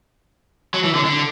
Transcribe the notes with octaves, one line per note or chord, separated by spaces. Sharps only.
F#3
E3
D3
D3